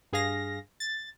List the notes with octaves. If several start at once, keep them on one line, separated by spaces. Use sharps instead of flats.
G2 G#4 F5 A#6
A6